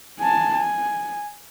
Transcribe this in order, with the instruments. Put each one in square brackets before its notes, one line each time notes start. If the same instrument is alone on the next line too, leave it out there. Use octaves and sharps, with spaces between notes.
[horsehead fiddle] G#5 A5
G#5